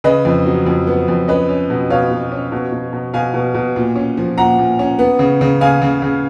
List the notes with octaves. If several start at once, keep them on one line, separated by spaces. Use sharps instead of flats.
C#3 B4 D#5
F2
F#3
F2
B3
F2
C#4 B4 D#5
C#4
B2
B2 C#5 F5
B2
C#4
B2
B2
B2
B2 F5 G#5
B2
B2
A#2
C#4
F3
A#2 F#5 A#5
A#2
C#4
B3
C#3
C#3
C#3 F5 G#5
C#3
C#3